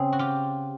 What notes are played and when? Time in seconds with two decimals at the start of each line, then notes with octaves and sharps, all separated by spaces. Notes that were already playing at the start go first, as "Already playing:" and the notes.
Already playing: C#3 C4 G#4
0.13 F#4
0.19 F4 G4